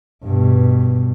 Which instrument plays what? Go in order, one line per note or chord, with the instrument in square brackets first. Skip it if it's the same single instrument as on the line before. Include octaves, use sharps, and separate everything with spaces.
[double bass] G2 B2